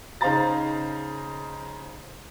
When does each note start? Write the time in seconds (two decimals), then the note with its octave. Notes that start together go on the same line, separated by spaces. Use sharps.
0.21 C#3 D#4 C5 F5 A#5 A6